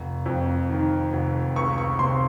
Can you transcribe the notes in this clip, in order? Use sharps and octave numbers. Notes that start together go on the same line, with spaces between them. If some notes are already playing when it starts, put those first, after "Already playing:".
Already playing: F1
F2
D#3
F1
C#2 C#6
C#6
C3 C6